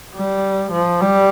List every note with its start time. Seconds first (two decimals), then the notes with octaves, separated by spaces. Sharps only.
0.15 G3
0.72 F3
1.01 G3